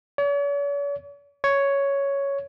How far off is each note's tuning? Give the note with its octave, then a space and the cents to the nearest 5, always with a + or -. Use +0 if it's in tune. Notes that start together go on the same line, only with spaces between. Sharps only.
C#5 +45
C#5 +5